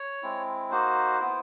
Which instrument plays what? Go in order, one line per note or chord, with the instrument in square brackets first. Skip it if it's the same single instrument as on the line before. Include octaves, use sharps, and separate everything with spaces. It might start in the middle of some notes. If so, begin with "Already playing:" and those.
Already playing: [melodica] C#5
G#3 C4 E4
A#3 D#4 F#4 C5
B3 E4